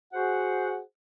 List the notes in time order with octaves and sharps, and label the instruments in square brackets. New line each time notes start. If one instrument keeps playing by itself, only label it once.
[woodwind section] F#4 G#4 C5 F#5